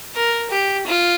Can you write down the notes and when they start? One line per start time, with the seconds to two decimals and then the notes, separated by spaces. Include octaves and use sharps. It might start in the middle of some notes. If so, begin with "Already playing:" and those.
0.15 A#4
0.51 G4
0.87 F4